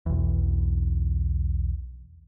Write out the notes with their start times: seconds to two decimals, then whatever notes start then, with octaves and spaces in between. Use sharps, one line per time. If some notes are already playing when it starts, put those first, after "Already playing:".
0.06 B1 E2